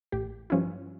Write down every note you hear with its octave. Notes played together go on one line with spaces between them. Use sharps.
A1 G4
G2 F3 C#4 E4